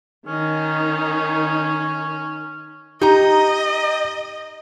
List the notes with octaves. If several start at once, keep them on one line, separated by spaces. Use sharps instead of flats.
D#3 C#4 D#4
D#4 G4 D#5 A#5